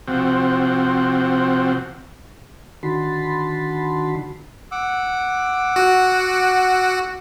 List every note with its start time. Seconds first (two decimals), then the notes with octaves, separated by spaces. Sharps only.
0.08 C3 F3 C4 F#4
2.83 D3 D#3 F#4 A5 B5 C6
4.71 F#5 D6 E6
5.76 F#4